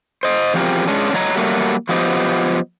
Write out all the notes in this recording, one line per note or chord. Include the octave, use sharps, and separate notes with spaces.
C5 D#5
E2 F3 C4 G4 G#4 A#4
G#3 C#4 D4
A2 F#3 D4 C#5 D#5 A#5
F#3 G3 A3 A#3
F3 F#3 B3 G4 C5 D#5